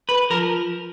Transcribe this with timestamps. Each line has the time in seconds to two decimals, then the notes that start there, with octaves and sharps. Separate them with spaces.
0.09 B4
0.30 F3 A#4